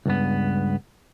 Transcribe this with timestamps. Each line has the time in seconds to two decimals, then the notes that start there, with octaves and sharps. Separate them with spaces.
0.06 C#2 G2 B3